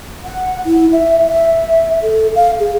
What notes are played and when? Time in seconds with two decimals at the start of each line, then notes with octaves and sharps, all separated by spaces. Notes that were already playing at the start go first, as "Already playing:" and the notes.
0.25 F#5
0.66 E4
0.92 E5
1.28 E5
2.03 A4
2.35 F5
2.59 G#4